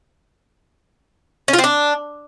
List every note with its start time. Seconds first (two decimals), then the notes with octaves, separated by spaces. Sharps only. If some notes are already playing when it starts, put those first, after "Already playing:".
1.48 C#4
1.53 F4
1.59 C4
1.64 D4